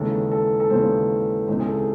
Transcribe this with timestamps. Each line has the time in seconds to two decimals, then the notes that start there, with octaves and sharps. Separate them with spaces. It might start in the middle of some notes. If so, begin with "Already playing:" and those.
Already playing: D#2 C#3 E3 G#3 A4
0.31 A4
0.60 A4
0.70 D#2 C#3 E3 G#3 C5
1.48 C#2 C#3 E3 C4 C5
1.59 G#4
1.67 A4